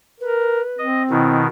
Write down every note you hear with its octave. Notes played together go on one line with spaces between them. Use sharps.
A#4 B4
C4 D#5
B2 D#3 E4